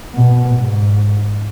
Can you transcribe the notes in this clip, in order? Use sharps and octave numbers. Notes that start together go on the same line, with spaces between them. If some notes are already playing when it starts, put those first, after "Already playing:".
B2
G#2